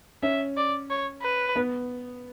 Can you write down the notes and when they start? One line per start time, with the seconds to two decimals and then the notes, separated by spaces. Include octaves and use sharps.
0.23 C#4 E5
0.57 D5
0.90 C#5
1.22 B4
1.56 B3